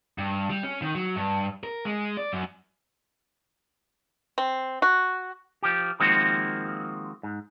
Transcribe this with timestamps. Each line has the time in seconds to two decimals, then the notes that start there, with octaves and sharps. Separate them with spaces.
0.18 G2
0.50 G3
0.63 C#4
0.82 D#3
0.95 F#3
1.16 G2
1.63 A#4
1.85 G#3
2.17 D5
2.32 F#2
4.38 C4
4.82 F#4
5.63 F3 G4
6.00 D#3 F3 G#3 A#3 C4 F#4
7.23 G#2